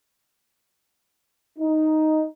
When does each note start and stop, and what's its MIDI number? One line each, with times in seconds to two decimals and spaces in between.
1.59 2.26 63